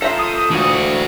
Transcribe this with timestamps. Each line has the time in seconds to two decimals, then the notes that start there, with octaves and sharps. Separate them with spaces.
0.02 F4 A4 C5 E5 A#5
0.19 D#6
0.51 D2 E3 F#4